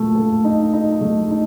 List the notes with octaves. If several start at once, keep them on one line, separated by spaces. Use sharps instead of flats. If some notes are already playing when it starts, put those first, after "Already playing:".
Already playing: A#2 A3
A4
D#4
D#4
A3
D#4